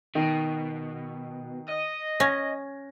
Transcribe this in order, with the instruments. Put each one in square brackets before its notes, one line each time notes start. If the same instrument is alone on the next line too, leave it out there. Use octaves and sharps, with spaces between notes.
[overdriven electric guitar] B2 [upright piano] D#3
[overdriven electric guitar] D#5
[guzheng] C#4 [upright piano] G#6 A#6